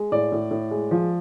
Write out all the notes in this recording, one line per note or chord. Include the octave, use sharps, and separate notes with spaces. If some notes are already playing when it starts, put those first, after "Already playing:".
Already playing: G#3
A2 D5
A2
A2
G#3
F3